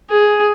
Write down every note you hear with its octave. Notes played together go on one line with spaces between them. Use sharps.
G#4